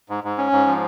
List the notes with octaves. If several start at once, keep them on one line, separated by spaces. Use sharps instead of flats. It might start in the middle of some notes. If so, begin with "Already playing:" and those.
G#2
G#2
C#4
G#2
F3